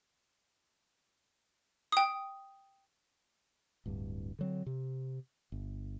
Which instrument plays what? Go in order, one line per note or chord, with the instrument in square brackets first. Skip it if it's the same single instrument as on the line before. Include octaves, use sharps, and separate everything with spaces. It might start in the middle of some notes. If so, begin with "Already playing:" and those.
[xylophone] G5 D#6
[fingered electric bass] D1 G2
D3 F#3 C4
C3
G1